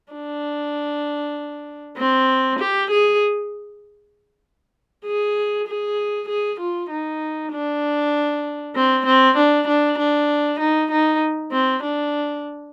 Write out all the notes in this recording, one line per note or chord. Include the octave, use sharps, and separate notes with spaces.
D4
C4
G4
G#4
G#4
G#4
G#4
F4
D#4
D4
C4
C4
D4
D4
D4
D#4
D#4
C4
D4